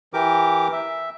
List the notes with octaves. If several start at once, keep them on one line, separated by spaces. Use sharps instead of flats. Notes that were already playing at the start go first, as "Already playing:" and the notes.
E3 G4 A#4 D6
E5